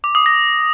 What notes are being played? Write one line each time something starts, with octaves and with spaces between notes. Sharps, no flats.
D6
D#6
A#6